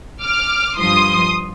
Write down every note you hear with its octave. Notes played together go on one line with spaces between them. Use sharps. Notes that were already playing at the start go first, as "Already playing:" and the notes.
D6 F6
G2 F3 C6 D#6